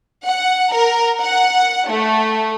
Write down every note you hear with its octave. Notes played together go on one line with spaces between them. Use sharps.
F#5
A#4
F#5
A3